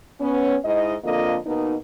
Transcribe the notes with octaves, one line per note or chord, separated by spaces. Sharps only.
B3 C#4
G#2 E4 D#5
F2 D3 A#3 F4 D#5
B2 A#3 D#4